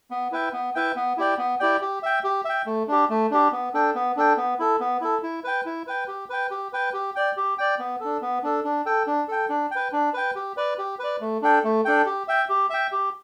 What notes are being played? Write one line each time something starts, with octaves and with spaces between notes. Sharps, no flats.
B3
E4 B4 E5 G5
B3
E4 B4 E5 G5
B3
E4 G4 D5 G5
B3
E4 G4 D5 G5
G4
E5 G5
G4
E5 G5
A3
D4 G4
A3
D4 G4
B3
D4 A4 G5
B3
D4 A4 G5
B3
E4 A4
B3
E4 A4
E4
B4 G5
E4
B4 G5
G4
B4 G5
G4
B4 G5
G4
D5 G5
G4
D5 G5
B3
D4 A4
B3
D4 A4
D4
A4 G5
D4
A4 G5
D4
B4 G5
D4
B4 G5
G4
B4 D5
G4
B4 D5
A3
D4 A4 G5
A3
D4 A4 G5
G4
E5 G5
G4
E5 G5
G4